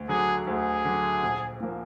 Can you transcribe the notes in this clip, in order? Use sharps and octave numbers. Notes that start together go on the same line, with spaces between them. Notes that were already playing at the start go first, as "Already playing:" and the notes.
Already playing: D2
D3 F#3 G#4
D2 G#4
D3 F#3
A#1
A#2 F3 A#3